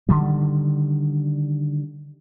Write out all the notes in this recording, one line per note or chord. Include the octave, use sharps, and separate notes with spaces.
D3 D#3 G3